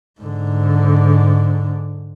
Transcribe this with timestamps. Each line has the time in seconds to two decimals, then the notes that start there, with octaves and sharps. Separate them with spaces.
0.20 G#2 D3